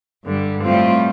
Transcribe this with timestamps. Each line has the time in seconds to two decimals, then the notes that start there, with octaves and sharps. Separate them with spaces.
0.25 G2 D3 G3
0.62 A2 G3 C4 F4